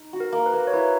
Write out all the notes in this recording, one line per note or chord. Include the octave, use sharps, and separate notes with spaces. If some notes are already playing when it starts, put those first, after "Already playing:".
Already playing: D#4
F#4
A#4
A#3
B4
A#3
C#5
E4 B4